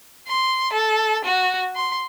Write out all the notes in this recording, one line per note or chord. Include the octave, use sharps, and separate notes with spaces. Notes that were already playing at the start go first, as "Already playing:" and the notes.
C6
A4
F#4
C6